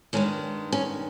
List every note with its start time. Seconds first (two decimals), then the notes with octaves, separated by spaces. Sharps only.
0.13 G2 D#3 G#3 C#4
0.72 C#4